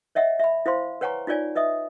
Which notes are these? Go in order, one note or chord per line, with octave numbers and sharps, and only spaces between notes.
C#5 D#5 E5 F#5
E5 B5
E4 C5 F5 C6
B4 C#5 F#5 G#5 A#5 C#6
D#4 F4 C#5 D5 G#5
B4 D#5 E5 D#6